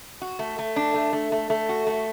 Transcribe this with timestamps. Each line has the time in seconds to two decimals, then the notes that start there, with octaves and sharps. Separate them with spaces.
0.22 F#4
0.39 A3
0.59 A3
0.76 D4
0.94 A3
1.13 A3
1.32 A3
1.50 A3
1.69 F#4
1.87 A3